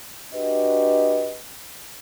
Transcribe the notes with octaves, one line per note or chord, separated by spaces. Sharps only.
D4 F#4 G4 B4 D#5